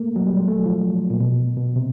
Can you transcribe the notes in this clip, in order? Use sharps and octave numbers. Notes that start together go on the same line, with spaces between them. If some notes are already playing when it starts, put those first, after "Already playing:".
Already playing: A3 A#3
F#3
G3
G#3
A3
F#3
F3
A#2
B2
B2
C3